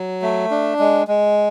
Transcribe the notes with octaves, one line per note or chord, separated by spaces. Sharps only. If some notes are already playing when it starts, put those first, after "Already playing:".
Already playing: F#3
A3
D4
G#3
G#3